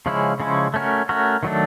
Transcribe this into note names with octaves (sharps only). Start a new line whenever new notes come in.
C#3 F3 G#3 C#4 E4
C#3 F3 G#3 C#4 E4
A3 C#4 F#4 A#4
A3 C#4 F#4 A#4
D#3 F#3 A3 D4